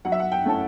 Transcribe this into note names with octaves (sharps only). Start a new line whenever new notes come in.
F#3 F#5
E5
F#5
G5
A3 C#4 E4 A5